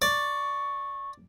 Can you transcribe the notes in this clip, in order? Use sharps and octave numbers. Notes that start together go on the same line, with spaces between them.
D5 C#6